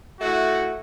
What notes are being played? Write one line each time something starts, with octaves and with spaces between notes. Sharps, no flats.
A3 E4 F#4